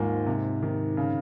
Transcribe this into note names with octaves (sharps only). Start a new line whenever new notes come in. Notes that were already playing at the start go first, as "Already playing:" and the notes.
Already playing: D#2 G#2 F3 A#3
C3
D#3
C#3